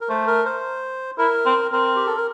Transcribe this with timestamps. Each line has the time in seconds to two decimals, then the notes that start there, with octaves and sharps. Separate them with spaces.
0.01 A#4
0.09 A3 C5
0.27 A#4
0.45 C5
1.18 E4 A#4
1.46 C4
1.72 C4 A#4
1.96 G4
2.07 A4
2.17 A#4